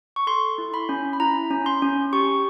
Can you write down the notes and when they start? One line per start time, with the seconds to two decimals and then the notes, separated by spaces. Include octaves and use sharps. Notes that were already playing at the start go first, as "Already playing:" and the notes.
0.16 C#6
0.27 A4 C6
0.58 E4
0.74 B5
0.89 C#4
1.13 B5
1.20 E4 A#5
1.51 C#4
1.66 C6
1.82 C#4
2.13 G4 C#6